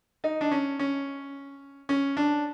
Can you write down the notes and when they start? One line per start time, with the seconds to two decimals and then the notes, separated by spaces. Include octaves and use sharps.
0.24 D#4
0.41 D4
0.51 C#4
0.79 C#4
1.89 C#4
2.17 D4